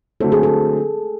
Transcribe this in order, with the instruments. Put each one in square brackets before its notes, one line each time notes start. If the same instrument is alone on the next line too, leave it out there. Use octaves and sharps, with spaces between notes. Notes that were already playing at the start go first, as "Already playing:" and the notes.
[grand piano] D3 F#3 A3 C4 [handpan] A4
[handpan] G#4
A4